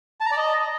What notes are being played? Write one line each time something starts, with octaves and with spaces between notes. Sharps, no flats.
A5
A#5
D5
D#5